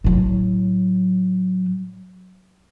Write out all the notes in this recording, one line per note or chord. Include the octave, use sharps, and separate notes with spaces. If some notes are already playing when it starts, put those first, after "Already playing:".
A2 F#3